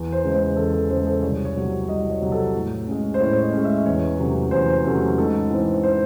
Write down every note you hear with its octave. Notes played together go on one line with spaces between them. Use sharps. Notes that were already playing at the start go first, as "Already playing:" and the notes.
Already playing: E2
C5
C#3 G#3
C5
E2 A4
A4
C#3 G#3 C5
A4
C2 C#5
C#5
C3 F#3
C2 D#5
C#5
C3 F#3
A4
A2
G#3 C#4
C5
A2 C#5
D#5
G#3 C#4
E5
E2 C#5
C3 F#3 A3 C#4
E2 C5
C3 F#3 A3 C#4
G#2 A4
E3 C4
C5